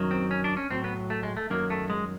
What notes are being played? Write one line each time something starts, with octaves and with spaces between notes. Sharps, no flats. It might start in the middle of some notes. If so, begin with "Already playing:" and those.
Already playing: F#2 D#3 F#3
C4
C#4
D4
C#4
A2 F#3 C4
B3
A3
G#3
A3
F#2 D#3 F#3 A#3
A3
G#3